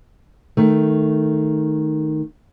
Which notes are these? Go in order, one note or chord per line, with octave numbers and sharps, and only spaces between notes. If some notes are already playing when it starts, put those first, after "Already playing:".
D#3 A3